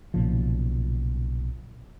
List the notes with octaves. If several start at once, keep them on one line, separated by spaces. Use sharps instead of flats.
B1 A#2 C#3 F3